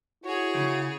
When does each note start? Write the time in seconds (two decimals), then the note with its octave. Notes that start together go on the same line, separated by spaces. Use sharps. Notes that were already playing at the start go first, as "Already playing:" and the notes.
0.24 E4 F#4 G#4 C#5
0.56 C#3